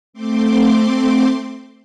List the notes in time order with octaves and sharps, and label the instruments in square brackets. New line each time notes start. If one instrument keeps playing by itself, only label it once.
[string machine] A3 C4 C6 D6